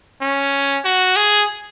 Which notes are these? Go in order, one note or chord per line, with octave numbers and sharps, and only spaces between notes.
C#4
F#4
G#4